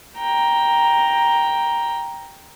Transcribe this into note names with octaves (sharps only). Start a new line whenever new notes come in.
G5 A#5